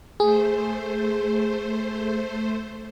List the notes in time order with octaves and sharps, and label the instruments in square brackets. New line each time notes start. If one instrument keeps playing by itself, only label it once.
[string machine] A3 C5 [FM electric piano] G#4